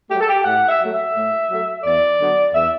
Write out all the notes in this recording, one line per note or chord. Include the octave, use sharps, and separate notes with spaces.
F#3 A3 G4
A4
G4
A2 F#5
E5
F#3 A3
E5
A2
F#3 A3
E2 D5
D3 F#3 B3
E2 E5